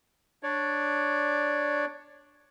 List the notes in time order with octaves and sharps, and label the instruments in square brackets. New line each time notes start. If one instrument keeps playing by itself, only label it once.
[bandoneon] D4 C#5 D5